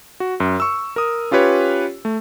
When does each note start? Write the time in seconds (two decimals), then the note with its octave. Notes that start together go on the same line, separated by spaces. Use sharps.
0.20 F#4
0.40 F#2
0.60 C#6 E6
0.96 A#4 D#6
1.31 C#4 F4 G4 B4 C#5
2.05 A3